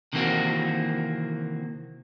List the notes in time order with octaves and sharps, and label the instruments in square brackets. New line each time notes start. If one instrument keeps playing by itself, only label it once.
[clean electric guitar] C3 D#3 E3 A#3 C4 F#4